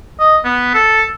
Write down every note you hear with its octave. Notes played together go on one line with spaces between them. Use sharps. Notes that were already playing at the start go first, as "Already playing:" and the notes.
D#5
B3
A4